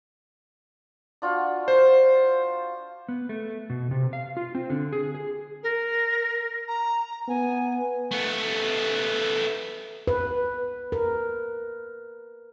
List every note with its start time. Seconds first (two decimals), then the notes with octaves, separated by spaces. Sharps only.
1.22 D4 F4 F#4
1.68 C5
3.09 B3
3.29 A3
3.70 B2
3.91 C3
4.13 F5
4.37 F4
4.55 C4
4.70 D3
4.93 G#4
5.15 G#4
5.63 A#4
6.68 A#5
7.28 B3 G#5
8.11 A3 B3
10.07 B4
10.92 A#4